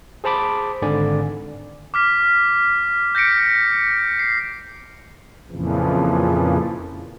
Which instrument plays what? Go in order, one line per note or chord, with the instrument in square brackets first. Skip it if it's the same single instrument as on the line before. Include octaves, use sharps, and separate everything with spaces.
[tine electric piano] G#4 C5 A5 B5 D6
G#1 G#2 D3 D5 G#5
[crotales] D6 F6 B6
G6 A#6 B6 C#7 D7
C7
[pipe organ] F2 A#2 C#3 E3 F3